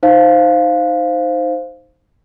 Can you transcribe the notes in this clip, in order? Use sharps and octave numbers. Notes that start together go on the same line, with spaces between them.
D#4 C5 F5